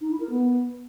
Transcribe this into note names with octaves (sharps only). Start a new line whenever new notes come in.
D#4
E4
A#4
B3